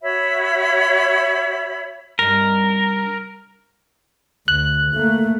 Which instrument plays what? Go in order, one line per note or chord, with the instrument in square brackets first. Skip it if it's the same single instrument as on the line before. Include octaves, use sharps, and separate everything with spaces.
[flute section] F#4 C#5 E5 B5
[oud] G2 C3 D#4 [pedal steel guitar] A#4
[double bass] D2 [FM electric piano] F#6
[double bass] A3 A#3